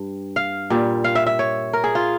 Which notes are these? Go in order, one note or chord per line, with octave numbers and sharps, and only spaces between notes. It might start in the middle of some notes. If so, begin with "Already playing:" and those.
Already playing: G2
F5
A#2 G3
F5
E5
E5
C#5
A#4
G#4
F4